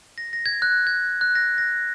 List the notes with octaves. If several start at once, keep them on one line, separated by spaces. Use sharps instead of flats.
A#6
A#6
G#6
F#6
G#6
F#6
A#6
A#6